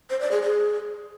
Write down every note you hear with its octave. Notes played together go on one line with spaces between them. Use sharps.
C5
D5
G#4
G#4